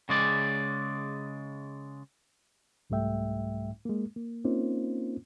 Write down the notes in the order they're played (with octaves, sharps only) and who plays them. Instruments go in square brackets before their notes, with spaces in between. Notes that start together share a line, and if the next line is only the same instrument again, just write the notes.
[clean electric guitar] C#3 G#3 D5
[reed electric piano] C2 G#2 G3 A3 E5 G5
G#3 A#3
A#3
A#3 C4 C#4 D#4 F4 C5